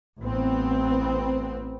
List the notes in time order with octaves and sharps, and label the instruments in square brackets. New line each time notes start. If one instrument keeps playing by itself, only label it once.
[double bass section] A1 B3 C4